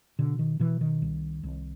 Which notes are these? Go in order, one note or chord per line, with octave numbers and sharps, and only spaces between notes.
B2 D3
D#3
B2 E3
D#3
C2
C2